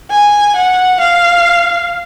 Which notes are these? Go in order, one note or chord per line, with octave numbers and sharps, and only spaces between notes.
G#5
F#5
F5